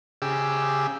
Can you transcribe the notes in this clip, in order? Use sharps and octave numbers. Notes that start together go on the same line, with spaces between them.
C#3 G4 G#4 D6 E6